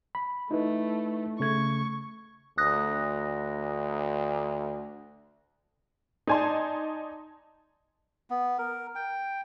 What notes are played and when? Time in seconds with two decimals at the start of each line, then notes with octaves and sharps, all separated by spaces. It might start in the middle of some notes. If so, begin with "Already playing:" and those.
0.15 B5
0.51 A3 D#4 E4 B4
1.40 C#3 A3 C#6 G#6
2.58 D2 D#6 F#6 A#6
6.27 D#4 D5 G#5 A5 C6
8.30 B3
8.59 A#4
8.95 G5